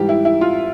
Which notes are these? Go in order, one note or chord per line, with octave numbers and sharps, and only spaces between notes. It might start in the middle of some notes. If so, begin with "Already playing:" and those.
Already playing: G#2 E3 G3 G4
E4
E4
F4